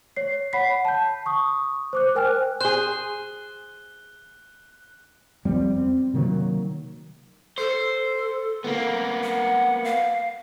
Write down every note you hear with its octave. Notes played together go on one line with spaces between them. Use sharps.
C#5 C7
C#5 F#5 B5 B6 C7
A5 G6
C#6 D#6
C5 D6 F#6
A#4 C5 G5 G#5 F6 F#6
G#4 C5 F#6 G7
F2 G3 C4
C4
C3 D#3 F#3 A#3
A4 C5
A#3 B3
F#5
F5